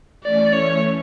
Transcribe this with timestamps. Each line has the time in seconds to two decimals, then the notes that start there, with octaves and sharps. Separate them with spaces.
0.23 E3 A3 C#4 D5
0.53 C#5